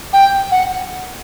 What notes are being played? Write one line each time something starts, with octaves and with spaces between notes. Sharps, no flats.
G5
F#5